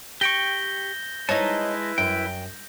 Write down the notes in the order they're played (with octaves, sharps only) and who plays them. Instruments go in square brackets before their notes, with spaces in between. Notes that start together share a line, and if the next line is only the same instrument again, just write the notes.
[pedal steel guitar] G4 G5 C#6 [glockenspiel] G6 A#6 G7
[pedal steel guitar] G#3 A5 [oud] D#4 C#5 [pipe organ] E4 B4
[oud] F#2 [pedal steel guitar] G5